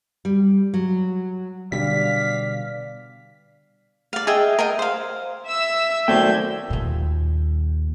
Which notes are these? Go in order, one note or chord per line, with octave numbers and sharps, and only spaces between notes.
G3
F#3
B2 D3 G3 D5 F5 B6
D5 F5
G#4 D#5 E5 G5
A#4 D#5 G5
C5 F5
E5 E6 E7
D#3 F#3 A3 C5 D5 G5 G6 G#6
D#2 A#2